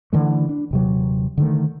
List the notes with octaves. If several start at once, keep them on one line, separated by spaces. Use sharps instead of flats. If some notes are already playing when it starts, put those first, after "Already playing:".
D3 E3 A3
D4
D#1 C3 F#3
D3 D#3 A3